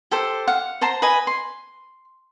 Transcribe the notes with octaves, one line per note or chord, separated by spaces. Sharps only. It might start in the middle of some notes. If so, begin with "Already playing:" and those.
G4 A4 C5
F5 F#5
C5 A5 A#5 C6
B4 D#5 G#5
C6